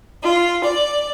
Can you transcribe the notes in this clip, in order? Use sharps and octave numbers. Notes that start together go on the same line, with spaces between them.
F4
D5